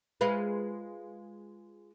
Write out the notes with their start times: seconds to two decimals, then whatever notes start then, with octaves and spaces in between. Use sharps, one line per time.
0.21 G#3 F4 B4